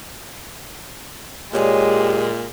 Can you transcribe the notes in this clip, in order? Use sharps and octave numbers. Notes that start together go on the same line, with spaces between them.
A#2 G#3 D4 G4 C#5 G#5